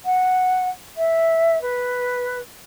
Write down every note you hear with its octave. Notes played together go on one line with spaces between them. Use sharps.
F#5
E5
B4